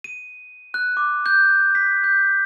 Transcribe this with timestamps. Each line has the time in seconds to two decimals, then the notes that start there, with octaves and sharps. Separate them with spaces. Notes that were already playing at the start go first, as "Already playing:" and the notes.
0.04 D#7
0.74 F#6
0.97 D6
1.26 G6
1.75 B6
2.04 G6